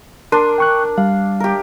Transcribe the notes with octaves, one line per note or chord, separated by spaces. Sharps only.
D4 A#4 C6
G5 C#6 F#6
G3 F5
G4 A#4